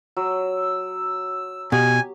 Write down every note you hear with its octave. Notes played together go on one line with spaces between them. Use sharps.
F#3 E6
B2 G4 G#5